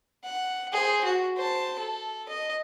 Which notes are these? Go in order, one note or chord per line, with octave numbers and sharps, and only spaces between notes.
F#5
G#4 C5
F#4
C5 A5
A4
D#5